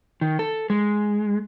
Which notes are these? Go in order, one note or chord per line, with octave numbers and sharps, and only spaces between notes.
D#3
A4
G#3